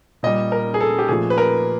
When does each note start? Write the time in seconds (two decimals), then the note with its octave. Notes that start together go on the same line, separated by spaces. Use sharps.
0.23 A#2 G3 D#5
0.52 A#4
0.74 G#4
0.81 A4
0.99 G4
1.08 A#2 F3 A3 G#4
1.30 B4
1.38 A#4